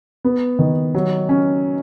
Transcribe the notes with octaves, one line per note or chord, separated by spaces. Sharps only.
B3
D#3
F#3
C#4